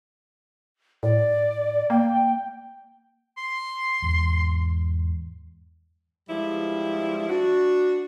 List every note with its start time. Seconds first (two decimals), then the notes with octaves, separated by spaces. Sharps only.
1.03 A2 D5
1.90 A#3 G5
3.38 C6
4.02 E2 G#2
6.29 G2 F3 G3 G#3 E4
7.29 D4 F#4